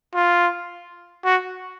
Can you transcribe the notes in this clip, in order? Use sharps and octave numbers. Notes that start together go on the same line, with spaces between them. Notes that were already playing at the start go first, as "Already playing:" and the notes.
F4
F#4